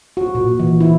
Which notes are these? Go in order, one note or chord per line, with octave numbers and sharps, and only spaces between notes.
F#4
A#2
E3
E4